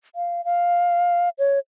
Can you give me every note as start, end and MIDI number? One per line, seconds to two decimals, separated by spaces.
0.16 0.44 77
0.45 1.29 77
1.39 1.59 73